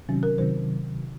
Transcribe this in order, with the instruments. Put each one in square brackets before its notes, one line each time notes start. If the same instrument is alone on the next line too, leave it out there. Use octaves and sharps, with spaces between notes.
[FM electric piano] C3 D#3 F#3 [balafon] C#4
[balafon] A#4
[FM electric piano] C3 D#3 F#3 [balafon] C5